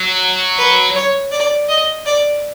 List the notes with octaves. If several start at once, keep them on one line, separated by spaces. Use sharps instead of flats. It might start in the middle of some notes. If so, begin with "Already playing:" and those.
Already playing: F#3
B4
C#5
D5
D#5
D5